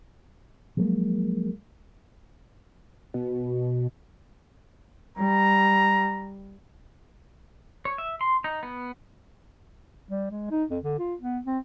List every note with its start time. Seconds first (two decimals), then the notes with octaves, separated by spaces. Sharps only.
0.77 F3 F#3 G#3 A#3
3.14 B2
5.18 G3 A#5
7.85 C#5
7.98 E5
8.21 C6
8.44 D#4
8.63 B3
10.10 G3
10.31 G#3
10.51 D#4
10.70 F2
10.83 D3
10.99 F4
11.20 B3
11.46 C4